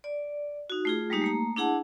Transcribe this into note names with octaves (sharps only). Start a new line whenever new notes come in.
D5
D#4 F#4
A3 F4 G#4
G3 G#3 A#3 D#4 G4
A3 A#3 A#5
D4 E4 G#4 F#5 A5